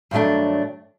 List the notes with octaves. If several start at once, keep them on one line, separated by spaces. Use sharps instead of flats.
G2 D#3 F#3 A3 D4